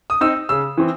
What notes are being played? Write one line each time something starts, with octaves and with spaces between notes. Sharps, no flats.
D#6
C4 D#4 E6
C#3 E6
E3 C4